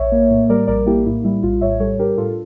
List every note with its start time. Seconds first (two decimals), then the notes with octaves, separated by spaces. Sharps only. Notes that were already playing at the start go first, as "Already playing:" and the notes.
Already playing: A#1 C#5 E5
0.12 A#3
0.30 A2
0.49 G3 A#4 D5
0.67 A#1 A#4 D5
0.86 A#3 E4 G4
1.06 A2 E4
1.24 G3 E4
1.43 A#1 F4
1.61 A2 C#5 E5
1.80 G3 A4 C#5
1.99 D4 G4 A#4
2.17 A2 F4 A4